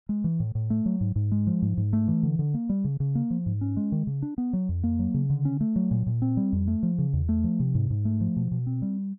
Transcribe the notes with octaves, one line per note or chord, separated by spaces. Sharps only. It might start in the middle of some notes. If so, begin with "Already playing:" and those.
G#3
E3
A2
A2
A3
F#3
G#2
G#2
G#3
F3
G#2
G#2
A3
E3
D3
D3
A#3
G3
C#3
C#3
A#3
F3
G#2
C#4
G#3
D#3
C#3
D4
B3
F#3
F2
A#3
F#3
C#3
D3
C#4
A3
F#3
A#2
A#2
C4
G3
F2
A3
F3
C#3
E2
A3
F3
C3
G#2
G#2
A3
F3
B2
B2
C4
G3